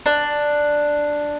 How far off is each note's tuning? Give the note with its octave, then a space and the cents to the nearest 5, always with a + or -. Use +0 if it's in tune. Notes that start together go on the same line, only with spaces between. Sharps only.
D4 +5